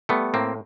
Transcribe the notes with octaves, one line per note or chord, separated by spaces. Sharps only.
G3 A3 B3
A2 A#3 C4